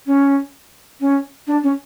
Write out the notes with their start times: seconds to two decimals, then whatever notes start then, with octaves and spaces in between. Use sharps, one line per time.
0.06 C#4
1.00 C#4
1.47 D4
1.63 C#4